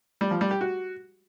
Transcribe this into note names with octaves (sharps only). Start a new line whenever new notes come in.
G3
F3
G3
G4
F#4